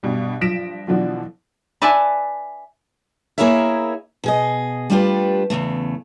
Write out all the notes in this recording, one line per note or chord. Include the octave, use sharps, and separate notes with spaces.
G2 B2 G3
G2 F3 A#6 B6 D7 E7
B2 D3 E3 F3 D4 F#4
B4 D5 E5 G#5 A5
A#3 E4 G#4 A#4 C#5 E5
B2 G#4 D#5
G3 A3 D4 F4 G4 B4
E2 G#2 C#3 A3